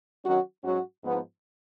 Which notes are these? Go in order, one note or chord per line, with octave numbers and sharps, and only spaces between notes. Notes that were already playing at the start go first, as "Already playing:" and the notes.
D#3 F#3 C#4 F#4
G#2 F#3 C#4 F#4
G#2 F3 B3 D#4